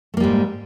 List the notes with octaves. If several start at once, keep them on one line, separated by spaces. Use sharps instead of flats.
G#2 G3 A3 A#3